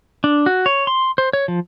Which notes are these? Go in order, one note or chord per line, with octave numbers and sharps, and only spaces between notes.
D4
F#4
C#5
C6
C5
C#5
F3